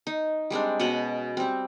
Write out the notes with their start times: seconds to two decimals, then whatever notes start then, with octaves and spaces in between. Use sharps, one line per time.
0.07 D#4
0.50 G3 G#3 C4 D4
0.80 B2 C#4 D#5 F#5
1.37 G3 C4